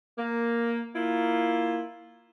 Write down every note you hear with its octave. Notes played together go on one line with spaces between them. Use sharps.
A#3
A#3 E4 F4